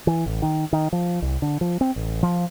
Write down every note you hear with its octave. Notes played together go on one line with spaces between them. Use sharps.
E3
A1
D#3
D#3
F3
C2
D3
F3
C4
A1
F3